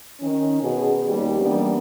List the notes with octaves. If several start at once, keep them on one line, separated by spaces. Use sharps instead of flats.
D#3 C#4
B2 G#4
D#2 G3
E3 G3 A#3 B3 C#4 D4